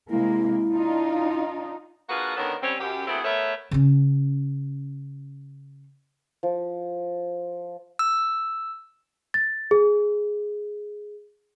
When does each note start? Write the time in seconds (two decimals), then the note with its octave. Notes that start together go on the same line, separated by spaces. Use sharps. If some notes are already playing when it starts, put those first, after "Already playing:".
0.10 C3 G#3 A#3 E4
0.72 D4 D#4 F4
2.10 A#3 D4 F4 F#4 G#4 B4
2.36 D3 D#3 B3 C#4 D4 A#4
2.62 G3 C4 C#4
2.80 F#2 G4
3.07 A3 B3 C4 E4 F#4 G#4
3.25 A3 B3 A#4 C#5 E5
3.71 C#3 C#4
6.43 F3
7.99 E6
9.34 A6
9.71 G#4